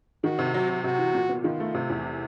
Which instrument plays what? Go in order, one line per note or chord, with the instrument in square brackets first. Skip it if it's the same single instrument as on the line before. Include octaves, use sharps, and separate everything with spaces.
[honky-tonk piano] D#3 [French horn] F#4
[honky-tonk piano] C3
[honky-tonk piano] F#3 [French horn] F#4
[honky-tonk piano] F#3
[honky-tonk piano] C3 [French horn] F#4
[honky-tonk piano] E3
A#2
B3
[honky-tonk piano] D#3 [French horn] F4
[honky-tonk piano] A3
C3
E2